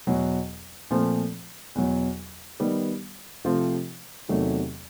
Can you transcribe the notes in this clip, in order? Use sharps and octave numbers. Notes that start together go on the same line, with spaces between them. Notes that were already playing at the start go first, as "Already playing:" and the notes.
E2 B2 F#3
A#2 F3 A3 C4 F4
E2 B2 F#3
D#3 G3 B3
C3 F3 A3 C4 F4
E2 C3 D#3 F#3 A3